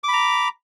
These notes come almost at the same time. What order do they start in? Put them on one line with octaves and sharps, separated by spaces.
D6 B5 A#5